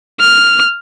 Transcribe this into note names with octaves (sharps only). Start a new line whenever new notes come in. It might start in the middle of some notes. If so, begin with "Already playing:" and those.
F6